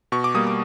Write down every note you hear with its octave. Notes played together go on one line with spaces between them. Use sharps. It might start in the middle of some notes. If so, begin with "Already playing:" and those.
B2 C#6
D6
G3 A#3 D#6
D6